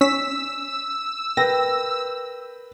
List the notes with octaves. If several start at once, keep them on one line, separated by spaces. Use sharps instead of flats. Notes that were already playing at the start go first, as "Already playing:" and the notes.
C#4 E6 B6
A#4 B4 G5 A#6